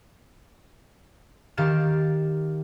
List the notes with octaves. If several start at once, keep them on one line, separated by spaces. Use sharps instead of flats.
D#3 G4 F5 A6 D7 E7